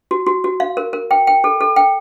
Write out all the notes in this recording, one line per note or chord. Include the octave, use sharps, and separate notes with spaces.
F#4
F#4
F#4
F5
A#4
A#4
G5
G5
A4
A4
G5